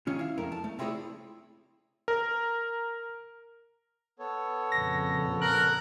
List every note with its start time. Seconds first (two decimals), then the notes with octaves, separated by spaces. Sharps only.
0.07 D#3 C#4 F4
0.19 E4 F5
0.38 F2 A3 A#4
0.52 A5
0.64 A3
0.79 C4 E4 F4 G#4 C#5 D5
2.08 A#4
4.19 B3 A4 C#5
4.72 F2 A#2 C#3 A#6
5.42 A#4 F#6